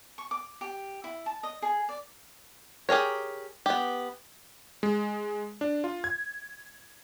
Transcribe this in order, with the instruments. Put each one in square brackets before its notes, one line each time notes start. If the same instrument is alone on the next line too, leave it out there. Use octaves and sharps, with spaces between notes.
[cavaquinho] C#6
D6
G4
E4
A5
D#5
G#4
D5
[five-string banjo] G4 G#4 A#4 C#5
B3 G4
[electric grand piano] G#3
D4
F4
G#6